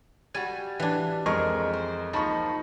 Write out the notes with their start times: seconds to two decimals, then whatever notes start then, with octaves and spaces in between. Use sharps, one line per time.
0.34 G3 F#4 G#5
0.80 E3 D4
1.26 F2 G#3 A#4 C#6
1.73 C5
2.13 F3 A#3 D#4 B5 C#6